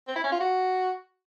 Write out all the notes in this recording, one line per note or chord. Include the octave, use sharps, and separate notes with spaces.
C4
E4
C#4
F4
F#4